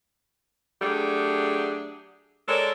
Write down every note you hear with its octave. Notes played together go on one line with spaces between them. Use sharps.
F#3 A3 D4 G4 G#4
G#3 A4 A#4 C#5 D5